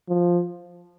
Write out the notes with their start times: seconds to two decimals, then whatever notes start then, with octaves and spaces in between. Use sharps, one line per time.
0.09 F3